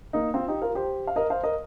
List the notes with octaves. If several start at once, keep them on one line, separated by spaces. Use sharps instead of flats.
A#3 D#4
C4 F4
D#4 G4
F4 A#4
G4 C5
F5
A#4 D#5
C5 F5
A#4 D#5